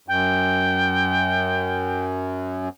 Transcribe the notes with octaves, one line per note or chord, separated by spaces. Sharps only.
F#2 G5